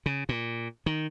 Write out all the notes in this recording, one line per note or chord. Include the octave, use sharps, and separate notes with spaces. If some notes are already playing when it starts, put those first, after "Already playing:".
C#3
A#2
D#3